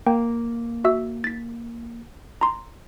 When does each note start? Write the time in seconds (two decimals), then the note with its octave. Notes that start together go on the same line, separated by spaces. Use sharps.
0.07 A#3 G5
0.84 F#4 E5 E6
1.24 A6 B6
2.41 A#5 C6